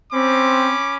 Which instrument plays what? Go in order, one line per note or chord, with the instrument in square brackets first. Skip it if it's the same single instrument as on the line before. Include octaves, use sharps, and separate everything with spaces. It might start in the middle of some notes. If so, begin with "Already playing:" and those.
[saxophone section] C4 [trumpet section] C#4 B5 D6